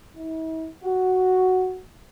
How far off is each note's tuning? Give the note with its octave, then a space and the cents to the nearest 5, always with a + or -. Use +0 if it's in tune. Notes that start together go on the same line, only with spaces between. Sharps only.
E4 -45
F#4 +0